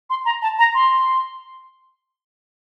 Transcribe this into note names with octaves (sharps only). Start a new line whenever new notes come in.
C6
A#5
A5
A#5
C6